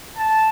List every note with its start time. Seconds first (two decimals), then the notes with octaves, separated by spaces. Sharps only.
0.17 A5